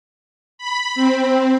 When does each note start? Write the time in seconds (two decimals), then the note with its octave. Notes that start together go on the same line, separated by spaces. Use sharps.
0.58 B5
0.95 C4